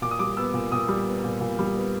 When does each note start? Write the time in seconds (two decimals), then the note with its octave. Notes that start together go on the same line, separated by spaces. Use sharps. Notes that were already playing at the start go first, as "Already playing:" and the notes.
0.02 A#2 D6
0.11 D#6
0.19 G3 D6
0.37 B3 E6
0.54 A#2
0.72 A#2 D#6
0.89 G3
1.07 B3
1.24 A#2
1.41 A#2
1.59 G3
1.75 B3